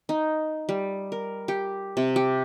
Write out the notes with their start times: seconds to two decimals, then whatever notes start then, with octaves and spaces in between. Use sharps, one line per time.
0.09 D#4
0.69 G3
1.12 A#4
1.48 G4
1.97 C3
2.16 G4